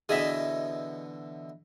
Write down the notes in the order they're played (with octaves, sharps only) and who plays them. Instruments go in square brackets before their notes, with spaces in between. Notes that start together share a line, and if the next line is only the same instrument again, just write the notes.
[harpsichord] B2 D3 E3 [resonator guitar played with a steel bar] G#4 D#5 E5